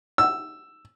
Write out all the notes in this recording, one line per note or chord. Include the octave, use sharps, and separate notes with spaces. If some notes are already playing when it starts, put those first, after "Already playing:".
E6